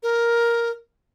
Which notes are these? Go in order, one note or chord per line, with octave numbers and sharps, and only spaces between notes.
A#4